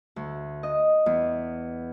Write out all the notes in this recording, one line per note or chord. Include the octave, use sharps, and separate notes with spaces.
D2
D#5
E2